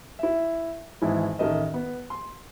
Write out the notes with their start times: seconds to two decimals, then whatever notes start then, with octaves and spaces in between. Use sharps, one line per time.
0.19 E4 E5
1.02 G#1 E3 G#3 E4
1.39 A1 D#3 A3 A#4 D#5 E5
1.74 B3
2.10 C6